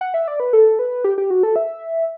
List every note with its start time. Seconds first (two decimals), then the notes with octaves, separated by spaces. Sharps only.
0.01 F#5
0.14 E5
0.28 D5
0.40 B4
0.53 A4
0.79 B4
1.04 G4
1.18 G4
1.30 F#4
1.43 A4
1.56 E5